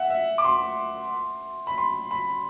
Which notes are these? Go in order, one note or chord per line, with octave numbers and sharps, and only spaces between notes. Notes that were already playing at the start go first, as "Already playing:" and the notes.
Already playing: E5 F#5
E5
D6
C6
B5
C6
B5